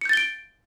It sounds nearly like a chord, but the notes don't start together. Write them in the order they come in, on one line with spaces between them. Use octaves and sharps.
C#7 G6 A6 G7 D7